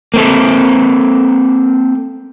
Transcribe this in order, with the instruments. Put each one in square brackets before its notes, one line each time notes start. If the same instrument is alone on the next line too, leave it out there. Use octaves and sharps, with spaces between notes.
[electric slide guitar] A#3 C4 A4